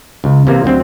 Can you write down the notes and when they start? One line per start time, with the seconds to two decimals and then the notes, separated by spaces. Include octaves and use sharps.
0.24 C#2
0.47 C3 E3 A#3
0.64 D2 F#3 C4